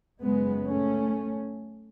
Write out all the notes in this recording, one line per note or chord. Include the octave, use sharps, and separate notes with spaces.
F#2 C#3 G#3 B3
A3 C#4